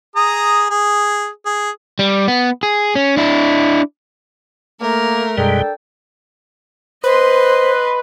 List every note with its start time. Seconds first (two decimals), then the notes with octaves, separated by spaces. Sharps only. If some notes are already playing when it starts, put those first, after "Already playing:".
0.16 G#4 A#5 D#6
0.70 G#4
1.45 G#4
1.99 G3
2.28 B3
2.63 G#4
2.95 C#4
3.17 D4 E4
4.81 A3 A#3 A#4
5.38 F#2 B2 G3 G#3 D4 A4 G5
7.04 B4 C5 D#5 C6